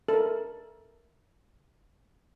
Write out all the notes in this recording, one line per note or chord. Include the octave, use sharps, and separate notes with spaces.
A4
A#4